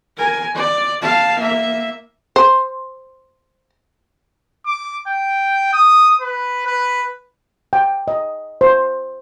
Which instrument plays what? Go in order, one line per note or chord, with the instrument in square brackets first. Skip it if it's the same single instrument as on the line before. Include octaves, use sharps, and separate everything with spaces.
[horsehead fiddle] A#4 G#5
D5
F5 A5
A#3 E5
[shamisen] C5
[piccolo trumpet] D6
G5
D#6
B4
B4
[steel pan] G5
D#5
C5